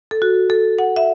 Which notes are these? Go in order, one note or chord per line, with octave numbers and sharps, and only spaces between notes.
A4
F#4
A4
F#5
E5